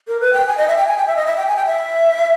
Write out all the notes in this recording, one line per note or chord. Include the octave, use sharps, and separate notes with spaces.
A#4
B4
G5
G#5
D#5
E5
G5
G#5
G5
E5
D#5
E5
G5
G#5
G5
E5